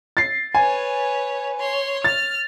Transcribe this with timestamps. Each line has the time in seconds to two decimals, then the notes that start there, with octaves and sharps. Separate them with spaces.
0.17 A6 C7
0.55 B4 C#5 G#5
1.58 C#5 C6
2.04 F6 A6